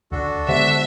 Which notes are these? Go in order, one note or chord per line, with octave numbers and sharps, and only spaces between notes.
D2 D3 D4 F#4 A4
D3 G#3 B3 G4 C5 E5 F#5